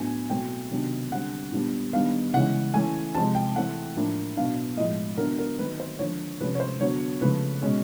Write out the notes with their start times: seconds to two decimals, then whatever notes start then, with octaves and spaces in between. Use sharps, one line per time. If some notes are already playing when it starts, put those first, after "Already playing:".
Already playing: A2 F#3 B3 D4 G#5
0.30 B2 F#3 A3 C4 G5
0.71 C3 D#3 F#3 B3 D4
1.11 D3 G3 C4 F#5
1.52 A#2 G3 B3 D4
1.93 D#3 G3 B3 D4 F5
2.33 C#3 E3 G#3 C#4 F#5
2.74 E3 A3 C#4 G#5
3.15 C3 F3 G#3 C4 A5
3.35 G5
3.56 E3 A3 C4 F#5
3.96 A2 F3 A#3 D4
4.36 B2 F#3 B3 D4 F5
4.77 A2 D#5
4.80 F3 G#3
5.18 D3 F#3 B3 D4 A#4
5.39 A#4
5.59 D#3 F#3 A3 C4 B4
5.80 C5
5.99 D3 F3 A#3 C#5
6.40 C3 F3 A3 C#4 B4
6.55 C#5
6.60 C5
6.80 D3 F#3 B3 C#5
7.21 C#3 F3 A3 B4
7.62 B2 G#3 C#4